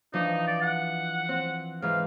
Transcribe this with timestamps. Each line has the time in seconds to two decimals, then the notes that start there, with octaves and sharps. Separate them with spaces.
0.13 E3 F3 D4 D#4
0.47 D5
0.62 F#5
1.29 C4
1.82 G#2 E3 F5